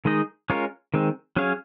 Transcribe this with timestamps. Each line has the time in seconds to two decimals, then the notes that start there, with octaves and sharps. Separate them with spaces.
0.05 D#3 G#3 D#4 G#4 D#5
0.50 G#3 C#4 F4 A#4 C#5
0.94 D#3 G#3 C4
1.36 F#3 C#4 G#4 C#5 F5